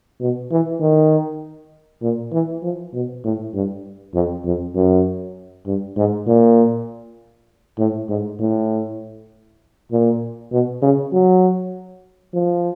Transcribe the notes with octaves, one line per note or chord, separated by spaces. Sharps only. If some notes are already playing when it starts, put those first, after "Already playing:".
B2
E3
D#3
A#2
E3
F3
B2
A2
G2
F2
F2
F#2
G2
G#2
A#2
A2
G#2
A2
A#2
B2
C#3
F#3
F3